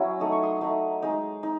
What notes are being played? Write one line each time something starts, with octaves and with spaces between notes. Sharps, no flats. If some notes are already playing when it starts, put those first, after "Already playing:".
Already playing: F#3 C#4 E4
A3 D#4 D#6
C#6
C6 D#6
A3 D#4
G#3 D#4
D#4